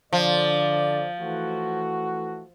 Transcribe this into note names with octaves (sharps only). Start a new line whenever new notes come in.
D3 F3 D5
E3 A3 F#4